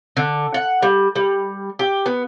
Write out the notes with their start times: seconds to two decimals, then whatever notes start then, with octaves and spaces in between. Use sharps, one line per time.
0.17 D3
0.54 F#5
0.82 G3
1.15 G3
1.79 G4
2.06 B3